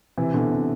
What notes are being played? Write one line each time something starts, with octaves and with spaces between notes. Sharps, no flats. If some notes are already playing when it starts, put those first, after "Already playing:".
C3 E3
B2 D3
C3